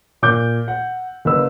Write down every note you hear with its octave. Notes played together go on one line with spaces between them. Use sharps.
A#2 D6 G6
F#5
F#1 B4 E6